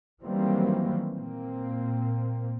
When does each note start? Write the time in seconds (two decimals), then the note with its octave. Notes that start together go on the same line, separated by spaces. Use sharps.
0.22 D#3 E3 F#3 G3 A#3 C4
1.14 A#2 A#3 C4